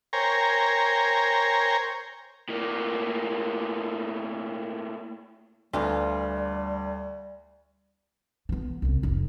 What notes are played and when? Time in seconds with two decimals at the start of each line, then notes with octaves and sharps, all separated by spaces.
0.13 A#4 C5 C#5 G5 G#5 A#5
2.49 A2 A#3
5.73 D2 E3 F3 G3 F4 D5
8.49 E3 B3
8.82 C2 C#3
9.03 F1 F2